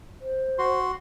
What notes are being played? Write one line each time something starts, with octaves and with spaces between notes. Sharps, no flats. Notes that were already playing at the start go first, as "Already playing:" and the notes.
C5
F#4 C6